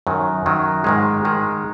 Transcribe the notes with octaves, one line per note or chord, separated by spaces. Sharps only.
F#2 D#3 F#3
F#2 D#3 F#3
G#2 D#3 G#3
D#3 G#3